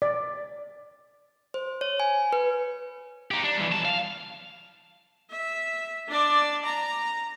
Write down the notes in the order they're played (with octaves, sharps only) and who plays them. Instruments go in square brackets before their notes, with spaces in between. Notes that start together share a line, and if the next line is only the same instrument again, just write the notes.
[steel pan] D5
[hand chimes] C5
C#5
G#5
B4
[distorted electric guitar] D#4 G4
D4
G2 E3
B1 A5
F5
[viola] E5
D4 D5
A#5